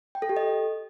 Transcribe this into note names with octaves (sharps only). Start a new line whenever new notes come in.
G5
A4
G4
D#5